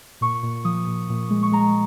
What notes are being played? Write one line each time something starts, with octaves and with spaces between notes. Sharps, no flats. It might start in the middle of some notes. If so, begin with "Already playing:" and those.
A#2 C#6
A#2
F3 D#6
A#2
A#2
G#3
C#6
G#3 A#5